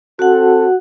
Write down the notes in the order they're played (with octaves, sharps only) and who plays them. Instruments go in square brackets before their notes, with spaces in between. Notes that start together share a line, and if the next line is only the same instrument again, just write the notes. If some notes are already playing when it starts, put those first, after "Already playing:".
[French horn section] C4 A4 [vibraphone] F#4 F#5